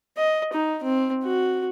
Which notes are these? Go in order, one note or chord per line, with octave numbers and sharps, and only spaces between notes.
D#5
D#4
C4
F#4